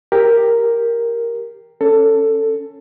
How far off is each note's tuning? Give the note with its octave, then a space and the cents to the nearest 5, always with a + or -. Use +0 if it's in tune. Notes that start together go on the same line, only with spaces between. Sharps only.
G4 +10 A#4 +0
C#4 +5 A4 +15